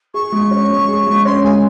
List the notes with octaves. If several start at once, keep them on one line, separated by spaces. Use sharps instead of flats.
G#4 C#6
G#3
C#4
G#3
G#4
G#3
C#4 C6
G#3 G#5